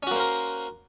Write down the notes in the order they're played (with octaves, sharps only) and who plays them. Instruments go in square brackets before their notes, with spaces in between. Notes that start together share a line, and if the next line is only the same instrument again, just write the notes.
[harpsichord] C#4
F#4
A#3
C5
A#4